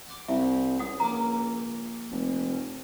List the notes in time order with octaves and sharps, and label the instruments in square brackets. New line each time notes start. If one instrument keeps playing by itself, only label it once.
[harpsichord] F#5 C6 D6
[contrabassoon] C2 [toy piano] E5
[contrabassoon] C#2 [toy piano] F#5 D#6
[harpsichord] A#1 A#3 D6 [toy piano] A#5
[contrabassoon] F1
[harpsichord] C2